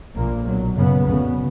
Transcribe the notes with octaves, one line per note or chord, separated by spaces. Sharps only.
A#1 A#2 A#3
B1 B2 F#3
F#1 F#2 C#3 B3
D2 C#3 B3